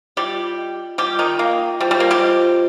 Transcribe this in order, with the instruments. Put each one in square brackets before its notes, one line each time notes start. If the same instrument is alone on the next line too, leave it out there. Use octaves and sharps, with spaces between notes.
[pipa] G3 G4 [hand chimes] F4 D#5 G5
[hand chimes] F4 D#5 G5
[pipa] G3 G4 [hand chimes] F4 D#5 G5
[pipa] D#3 D#4
[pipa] A#3 [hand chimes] F4 D#5 G5
[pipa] G3 [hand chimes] F4 C5 D#5 G5
[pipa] G3
A#3
G3 G4
[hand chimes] F4 C5 D#5 G5